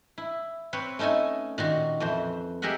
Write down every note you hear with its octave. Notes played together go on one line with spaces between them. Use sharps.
E4
C4 B4 C#5
A3 C#4 D#4 A4 G#5
A#2 D#3 F#4
F2 E3 C5
G4 G#4 A#4 D#5 E5 F#5